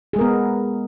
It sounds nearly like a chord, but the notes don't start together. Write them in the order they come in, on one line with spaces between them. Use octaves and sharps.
G#4 G#3 A#4 B3